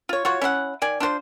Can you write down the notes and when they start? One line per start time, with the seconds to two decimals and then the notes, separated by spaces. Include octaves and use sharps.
0.09 F4 C#5
0.25 F4 F#4 C#5
0.41 C#4 E4 F5 F#5
0.82 D#3 D5 G#5
1.00 D4 F4 F#4 C5